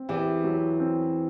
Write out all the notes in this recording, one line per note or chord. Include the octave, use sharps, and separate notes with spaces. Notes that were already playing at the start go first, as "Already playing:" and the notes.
Already playing: C4
E2 E3 G4
F#3
C4